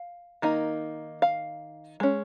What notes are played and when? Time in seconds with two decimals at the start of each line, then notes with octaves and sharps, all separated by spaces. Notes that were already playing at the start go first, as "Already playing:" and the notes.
Already playing: F5
0.42 D#3 A#3 D#4
1.22 F5
2.00 G#3 C#4